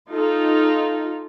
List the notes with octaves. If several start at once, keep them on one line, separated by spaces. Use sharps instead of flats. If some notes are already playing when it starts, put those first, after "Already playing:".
D#4 F4 A4